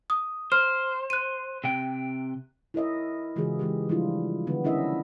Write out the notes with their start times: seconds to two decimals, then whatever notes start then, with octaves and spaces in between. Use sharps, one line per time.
0.10 D#6
0.52 C5 F6
1.10 F#6 D#7
1.64 C3 G5
2.74 E4 A#4 D#5 E5
3.36 C#3 E3 G#3 F4 F#4 G#4
3.59 E3 G#3 G4
3.89 F3 G3 D4 E4 F4
4.47 D3 E3 B3 D4
4.64 C#4 D4 E4 A#4 D#5 E5